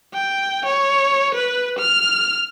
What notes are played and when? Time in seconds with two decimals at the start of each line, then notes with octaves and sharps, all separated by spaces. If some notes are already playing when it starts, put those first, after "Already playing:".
0.14 G5
0.66 C#5
1.35 B4
1.79 F6